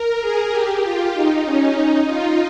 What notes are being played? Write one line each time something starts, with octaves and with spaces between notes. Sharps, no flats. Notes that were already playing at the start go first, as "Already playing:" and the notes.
Already playing: A#4
G#4
G4
F4
D#4
C#4
D#4
F4